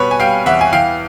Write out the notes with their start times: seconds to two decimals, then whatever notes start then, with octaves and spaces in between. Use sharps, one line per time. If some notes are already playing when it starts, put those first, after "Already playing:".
Already playing: B2 G3 B4 C#5
0.11 G#5
0.20 G3 F5 G5
0.46 E2 E5 F#5
0.61 G#5
0.73 E3 F5 G5